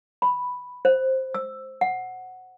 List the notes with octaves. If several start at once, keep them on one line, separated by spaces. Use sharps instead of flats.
B5
C5
E6
F#5